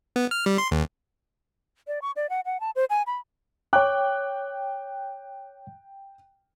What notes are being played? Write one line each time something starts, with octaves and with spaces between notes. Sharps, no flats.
B3
F6
G3
C6
D#2
D5
C#6
D5
F#5
F#5
A5
C5
G#5
B5
C#5 G5 D6 F#6